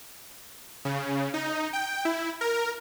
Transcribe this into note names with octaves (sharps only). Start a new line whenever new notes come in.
C#3
D#4
G5
E4
A#4